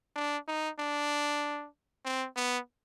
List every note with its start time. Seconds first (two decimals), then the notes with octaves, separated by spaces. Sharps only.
0.16 D4
0.48 D#4
0.79 D4
2.05 C4
2.37 B3